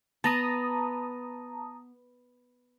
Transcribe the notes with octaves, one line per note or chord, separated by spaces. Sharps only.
B3 A5 A#5 D#6